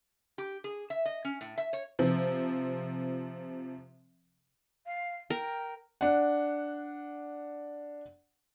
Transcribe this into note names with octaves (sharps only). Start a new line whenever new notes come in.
G4
G#4
E5
D#5
C#4
A2
E5
C#5
C3 F3
F5
A#4 G5
D4 F#5